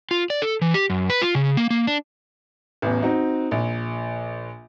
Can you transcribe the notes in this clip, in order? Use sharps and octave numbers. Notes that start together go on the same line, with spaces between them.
F4
D5
A4
E3
G4
F#2
B4
F4
C#3
A#3
A#3
D4
A1 E2
C4 D#4 F#4
A#1